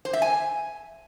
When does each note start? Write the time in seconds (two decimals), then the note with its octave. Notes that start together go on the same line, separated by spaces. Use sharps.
0.05 C5
0.13 E5
0.22 G#5